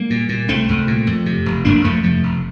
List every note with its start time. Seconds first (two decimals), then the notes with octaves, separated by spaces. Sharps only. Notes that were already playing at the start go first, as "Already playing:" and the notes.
Already playing: G3 A#3
0.10 A#2
0.29 A#2
0.48 C2 A3 C4
0.69 C2
0.88 A#2
1.07 F2
1.26 C3
1.46 F1
1.65 F1 A#3 D4
1.84 F2 F3 A3
2.04 C3 F3 A3
2.23 F1